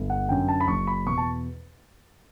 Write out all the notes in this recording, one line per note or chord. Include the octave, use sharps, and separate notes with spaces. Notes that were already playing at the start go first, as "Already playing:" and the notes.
Already playing: G1
F#5
F#2 D3 G5
A5
B5
F#1 C#6
B5
E2 B2 C#6
A5